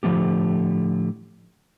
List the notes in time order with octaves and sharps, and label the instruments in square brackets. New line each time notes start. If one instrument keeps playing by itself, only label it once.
[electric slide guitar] A2 D3 F3 A3 B3 G4